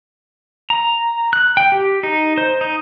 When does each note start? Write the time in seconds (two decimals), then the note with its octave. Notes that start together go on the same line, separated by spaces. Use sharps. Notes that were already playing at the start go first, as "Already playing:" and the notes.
0.70 A#5
1.33 F#6
1.57 G5
1.72 G4
2.03 D#4
2.38 C5
2.61 D#4